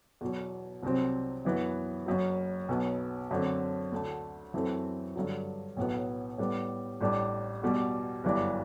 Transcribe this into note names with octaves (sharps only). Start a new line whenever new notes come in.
E2 B2 F#3
C2 C3 F#3 C4
F#2 E3 B3
F#1 F#2 F#3
B1 B2 F#3 B3
F#2 D3 A3 C4
D2 D3 A3
F#2 E3 A3 C4
G2 D3 F#3
B1 A2 F#3 B3
A2 G3 B3
A1 A2 G3 D4
E2 B2 G3
G1 F#2 E3 G3 D4